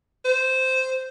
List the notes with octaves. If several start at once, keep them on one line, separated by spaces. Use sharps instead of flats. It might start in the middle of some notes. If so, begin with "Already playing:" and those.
C5